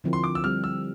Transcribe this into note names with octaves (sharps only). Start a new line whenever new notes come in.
D3 F3 C4 E4 A#4
C6
D6
E6
G3 C4 G4 F6
E6